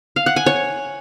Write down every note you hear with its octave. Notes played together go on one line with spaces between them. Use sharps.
F5
F#5
G#5
C#5